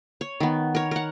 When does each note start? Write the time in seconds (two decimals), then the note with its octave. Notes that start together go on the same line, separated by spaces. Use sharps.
0.21 C#5
0.40 D#3 B3
0.75 A#4 C#5
0.91 A#4 F#5